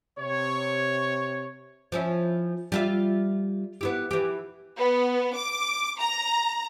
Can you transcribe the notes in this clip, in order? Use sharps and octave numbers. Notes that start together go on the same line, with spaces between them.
C3 C#5
F3 C#4 E4
G3 F4 E5
B3 E4 G4
E3 G4
B3
D6
A#5